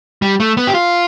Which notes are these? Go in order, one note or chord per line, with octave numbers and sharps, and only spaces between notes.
G3
A3
B3
G4
F4